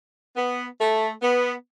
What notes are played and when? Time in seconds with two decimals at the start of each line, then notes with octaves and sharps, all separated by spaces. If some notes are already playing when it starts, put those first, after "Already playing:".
0.37 B3
0.80 A3
1.22 B3